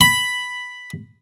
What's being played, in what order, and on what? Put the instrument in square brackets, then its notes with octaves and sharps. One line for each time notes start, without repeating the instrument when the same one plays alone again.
[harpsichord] B5